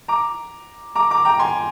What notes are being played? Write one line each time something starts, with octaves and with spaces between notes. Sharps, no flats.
A#5 D6
A#5 D6
A#5 D6
G5 A#5
G#5 C6